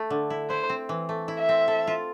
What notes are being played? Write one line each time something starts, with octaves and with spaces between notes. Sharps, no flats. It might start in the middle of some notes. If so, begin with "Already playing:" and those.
Already playing: A3
D3
E4
E4 C5
C4
E3
A3
E4
E5
C4
A4
F4